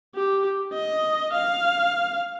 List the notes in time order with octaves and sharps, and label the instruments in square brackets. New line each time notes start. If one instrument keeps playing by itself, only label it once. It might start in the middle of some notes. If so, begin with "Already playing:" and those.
[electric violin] G4
D#5
F5